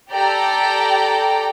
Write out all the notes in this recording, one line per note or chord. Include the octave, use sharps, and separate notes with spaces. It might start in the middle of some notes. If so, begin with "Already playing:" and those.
G4 A4 D5 G5 A#5